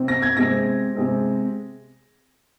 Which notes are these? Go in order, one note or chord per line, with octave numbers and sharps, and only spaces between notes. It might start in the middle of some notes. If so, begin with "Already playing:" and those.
Already playing: C3 C4
A#6
G#6
C3 G#3 C4 A#6
C3 G#3 C4